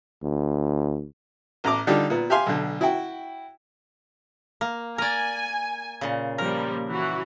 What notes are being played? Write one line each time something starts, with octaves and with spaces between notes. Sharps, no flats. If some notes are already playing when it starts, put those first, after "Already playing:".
D2
A1 A#5 D6
D3 G3 D#4 F4 G4
A#2 B3
G4 E5 F5 G#5 C6
B1 D3
E4 F#4 G5
A#3
A#4 D5 G#5
A#2 C#3
F3 G3 A#3 A#4
E3 F#4